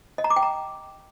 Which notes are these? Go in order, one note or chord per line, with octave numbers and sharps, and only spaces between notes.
D#5
A#5
D6
G5
A#5